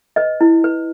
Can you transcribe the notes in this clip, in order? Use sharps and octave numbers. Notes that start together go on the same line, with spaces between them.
B4 D#5
E4
B4